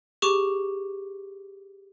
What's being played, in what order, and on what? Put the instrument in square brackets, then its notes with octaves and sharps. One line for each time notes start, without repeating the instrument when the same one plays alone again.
[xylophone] G4 G#4 C#6 D6